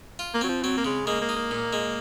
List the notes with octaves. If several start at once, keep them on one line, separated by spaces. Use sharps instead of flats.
F4
A#3
F#3 C4
F3
F#3 C4
A#3
C#3 G#3
G#3 A#3
A#3
D#4
A#3
A#2
G#3